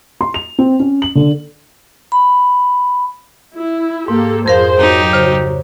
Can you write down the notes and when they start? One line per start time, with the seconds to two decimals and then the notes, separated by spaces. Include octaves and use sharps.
0.21 C6
0.34 F7
0.59 C4
0.80 C#4
1.02 F#7
1.15 D3
2.12 B5
3.54 E4
4.08 G#2 A#3 G4 A4
4.46 F2 F3 G#4 A#4 C5 F5
4.78 F#3 D#4 G4
5.13 C#3 C5